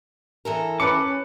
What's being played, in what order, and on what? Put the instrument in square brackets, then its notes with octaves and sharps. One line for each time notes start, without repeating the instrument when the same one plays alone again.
[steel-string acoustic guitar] E3 A4 A#4
[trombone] C#4 [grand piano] B4 A5 C#7 [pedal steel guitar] D6